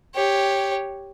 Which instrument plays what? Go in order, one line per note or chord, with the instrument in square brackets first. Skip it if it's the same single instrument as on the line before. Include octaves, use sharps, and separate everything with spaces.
[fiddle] G4 C#5